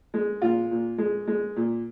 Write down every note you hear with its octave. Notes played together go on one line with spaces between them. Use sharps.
G#3
A#2 F4
A#2
G#3
G#3
A#2